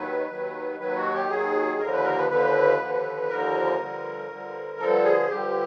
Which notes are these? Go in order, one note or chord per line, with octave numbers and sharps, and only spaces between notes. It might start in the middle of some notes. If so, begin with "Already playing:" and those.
Already playing: D#2 D#3 F#3 B4
D#2 D#3 F#3
D#2 D#3 F#3 B4
F#4
G4
D#2 D#3 F#3 G#4
D#2 D3 F3 A#4
B4
A#4
B4
D#2 D3 F3 B4
D#2 D3 F3
D#2 D3 F3 A#4
G2 D3 F3
G2 D3 F3
G2 D3 F3 A4
G#4
G2 D3 F3 G4